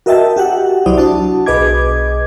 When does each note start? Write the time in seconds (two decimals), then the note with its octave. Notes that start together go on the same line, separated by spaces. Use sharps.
0.06 F#4 A#4 D#5 E5 G5 A5
0.36 F#4 G4 E5 F#5
0.86 C2 F#3 E4 C5 D5 D#6
0.98 D4 F#4 A5
1.46 B1 G#4 B4 D#5 D6 G#6